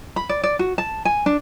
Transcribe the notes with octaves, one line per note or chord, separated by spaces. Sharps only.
B5
D5
D5
F#4
A5
G#5
D4